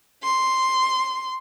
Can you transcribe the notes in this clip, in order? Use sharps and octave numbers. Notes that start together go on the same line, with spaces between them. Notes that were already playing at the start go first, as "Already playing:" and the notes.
C6